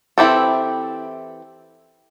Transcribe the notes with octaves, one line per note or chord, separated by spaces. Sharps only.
E3 C4 E4 G4 A4